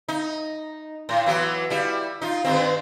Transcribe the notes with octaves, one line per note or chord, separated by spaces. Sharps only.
D#4
A2
E3 F#3 B3
G3 E4
D#4 F4
G2 D#3 C4